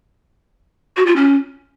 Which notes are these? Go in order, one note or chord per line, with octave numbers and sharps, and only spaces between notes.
F#4
F4
C#4